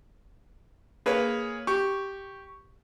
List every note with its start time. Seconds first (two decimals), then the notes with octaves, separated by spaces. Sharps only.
1.06 A#3 G#4 B4 C#5 F5
1.67 G4 C#6